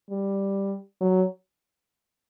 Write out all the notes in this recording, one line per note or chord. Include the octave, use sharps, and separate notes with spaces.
G3
F#3